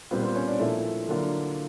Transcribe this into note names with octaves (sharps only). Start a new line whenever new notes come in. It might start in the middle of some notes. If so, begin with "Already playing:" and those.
A#2 G3 B3 C4 F4 B4
C4 C5
C#4 C#5
D4 D5
A#2 F3 A3 E4 E5
D3 F#3 A#3 D4 F4